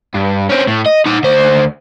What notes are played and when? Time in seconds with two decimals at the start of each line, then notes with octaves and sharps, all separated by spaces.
0.15 G2
0.49 C4 C#4
0.67 A2
0.86 D#5
1.06 D#4 F#5
1.23 D2 C5